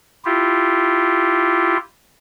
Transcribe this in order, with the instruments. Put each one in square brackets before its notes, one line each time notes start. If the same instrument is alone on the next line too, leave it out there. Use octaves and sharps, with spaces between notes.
[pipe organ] E4 F4 G4